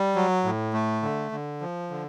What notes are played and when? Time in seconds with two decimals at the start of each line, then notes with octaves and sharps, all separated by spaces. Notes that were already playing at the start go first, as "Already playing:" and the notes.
Already playing: G3
0.16 F#3
0.44 A2
0.73 A3
1.02 D3
1.32 D3
1.61 F3
1.90 D3